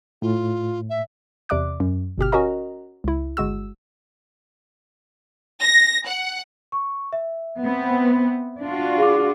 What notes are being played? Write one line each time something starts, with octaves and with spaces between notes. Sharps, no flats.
A2 F4
E5
E2 C3 D5 E5 D6 F#6
F#2
G1 B2 G4 F6
C#4 F#4 A#4 D#5 A#5
C#2 E4
G1 G#3 F#4 E6
A#6
F#5
C#6
E5
B3 C4
D4 F4 F#4
G#4 F5 D6